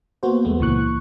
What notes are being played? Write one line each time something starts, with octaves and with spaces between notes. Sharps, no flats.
A#3 B3 F#4 C5
E2 G#3 A3 B3
C#2 A#2 E3 C#6 F#6